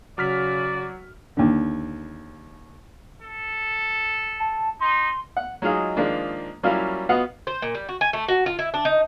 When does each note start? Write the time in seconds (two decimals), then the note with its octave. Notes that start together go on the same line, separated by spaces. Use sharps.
0.18 C#3 F#3 F#4 D5 F6 B6
1.37 D#2 D3
3.22 A4
4.40 A5
4.80 D#4 C6
5.37 F#5
5.62 F#3 G#3 D#4 F4 G#4
5.97 D#3 F3 G#3 A#3 D4
6.63 F#3 G3 A#3 C#4 E4 F4
7.09 B3 F4 F#4 D#5 F5 F#5
7.47 C5
7.62 A#2
7.75 G3
7.89 F#4
8.01 G#5
8.13 A3
8.28 F#4
8.46 F4
8.59 E4
8.74 D4
8.85 D#4